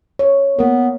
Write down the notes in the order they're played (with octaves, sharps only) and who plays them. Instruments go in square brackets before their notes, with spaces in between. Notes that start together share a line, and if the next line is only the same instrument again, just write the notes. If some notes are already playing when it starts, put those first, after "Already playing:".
[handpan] C#5
[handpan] A#3 A#4 [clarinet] B3